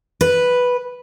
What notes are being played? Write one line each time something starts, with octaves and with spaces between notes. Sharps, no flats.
B4